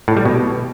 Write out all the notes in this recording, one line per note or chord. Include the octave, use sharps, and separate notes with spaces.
A2
G3
B2